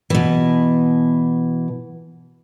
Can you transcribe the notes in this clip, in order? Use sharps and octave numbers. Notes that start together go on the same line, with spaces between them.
B2 E3